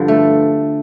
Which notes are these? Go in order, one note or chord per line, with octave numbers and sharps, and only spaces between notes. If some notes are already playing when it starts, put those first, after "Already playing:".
Already playing: G2 D3 F3
A3